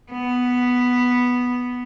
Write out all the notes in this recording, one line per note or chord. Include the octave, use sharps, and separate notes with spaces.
B3